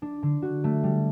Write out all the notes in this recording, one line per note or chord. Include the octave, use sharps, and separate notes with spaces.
D4
D3
F#4
A3
G3